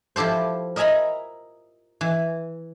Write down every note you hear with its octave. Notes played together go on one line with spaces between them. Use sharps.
F3 E4 G4 A4 C5
A#4 D#5 E5 G#5 A#5 B5
E3